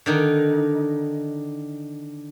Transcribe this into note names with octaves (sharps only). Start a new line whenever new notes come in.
D3 D#3 D#4